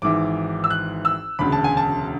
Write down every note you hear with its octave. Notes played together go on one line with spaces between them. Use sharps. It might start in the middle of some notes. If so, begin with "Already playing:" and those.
G#1 G#2 E3 D6
E6
F#6
E6
E1 D2 C#3 B5
A5
G#5
A5